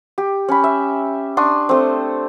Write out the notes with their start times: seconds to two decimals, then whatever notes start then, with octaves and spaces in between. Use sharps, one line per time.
0.18 G4
0.48 C#4 B5
0.64 E5
1.37 D4 C6 C#6 D#6
1.69 A3 C4